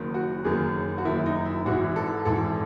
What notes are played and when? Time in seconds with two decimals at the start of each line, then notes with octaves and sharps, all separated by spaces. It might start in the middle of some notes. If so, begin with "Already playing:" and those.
Already playing: F#1 F#2 D#3
0.14 F#4
0.45 F#1 F#2 D#3 G#4
0.98 F#4
1.05 F#1 F#2 D#3 E4
1.26 D#4
1.45 E4
1.66 G#1 G#2 E3 F#4
1.96 A4
2.25 G#1 G#2 E3 A4